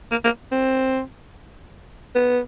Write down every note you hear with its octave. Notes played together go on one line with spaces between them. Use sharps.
A#3
A#3
C4
B3